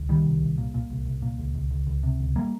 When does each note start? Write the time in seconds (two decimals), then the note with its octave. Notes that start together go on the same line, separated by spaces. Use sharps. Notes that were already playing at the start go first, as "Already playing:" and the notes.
Already playing: C#2
0.09 A#2 D#3 G3
0.26 C2
0.42 C2
0.58 A#2
0.74 A#2
0.90 C2
1.06 C2
1.22 A#2
1.38 C#2
1.55 C#2
1.71 C#2
1.87 C#2
2.03 C3
2.20 C#2
2.36 G3 A#3